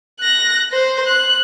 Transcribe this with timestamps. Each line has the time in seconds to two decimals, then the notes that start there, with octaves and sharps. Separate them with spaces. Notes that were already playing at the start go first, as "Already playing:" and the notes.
0.20 F#6 A#6
0.73 C5
1.07 F#6